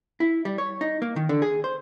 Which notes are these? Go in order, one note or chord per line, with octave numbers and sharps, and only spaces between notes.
E4
G3
C#5
D#4
A#3
D#3
D3
G#4
C5